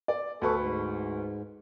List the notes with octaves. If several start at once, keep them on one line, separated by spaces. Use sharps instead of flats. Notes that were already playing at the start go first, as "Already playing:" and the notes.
D5
D2 A4 B4 C#6
G#2